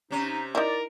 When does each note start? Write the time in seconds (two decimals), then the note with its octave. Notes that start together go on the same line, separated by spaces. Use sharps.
0.11 C3 C#4 D#4
0.55 D#4 E4 A#4 D5